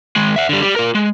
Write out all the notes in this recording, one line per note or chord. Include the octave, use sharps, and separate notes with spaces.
D#3 G#3
E5 F#5
D3 G3
G3
F4 A#4
G#3